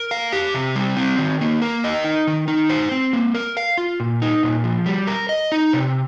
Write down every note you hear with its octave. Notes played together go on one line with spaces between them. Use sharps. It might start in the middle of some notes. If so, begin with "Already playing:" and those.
Already playing: A#4
F5
G4
C3
G3
C4
D#3
A#3
A#4
D#5
D#4
D#3
D#4
C5
C4
A#3
A#4
F5
F4
A#2
D#4
A#2
F3
G3
A#4
D#5
D#4
C3